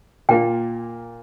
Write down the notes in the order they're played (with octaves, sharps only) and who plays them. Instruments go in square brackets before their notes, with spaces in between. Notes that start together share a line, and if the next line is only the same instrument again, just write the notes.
[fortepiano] A#2 A#3 F4 A#4 [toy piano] G5